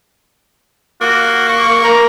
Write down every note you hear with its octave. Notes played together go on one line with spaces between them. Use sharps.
A#3 F#4
C#6
A#4